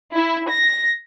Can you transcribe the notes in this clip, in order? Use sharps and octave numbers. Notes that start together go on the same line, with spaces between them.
E4
A#6